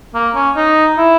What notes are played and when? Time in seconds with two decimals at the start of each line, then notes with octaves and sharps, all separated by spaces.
0.14 A#3
0.35 C#4
0.56 D#4
0.98 E4